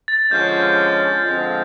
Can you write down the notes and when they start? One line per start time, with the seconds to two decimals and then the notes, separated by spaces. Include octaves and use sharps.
0.08 A6
0.31 D3 F3 G#3 C#4 G6
1.23 D3 F3 G#3 C4 F4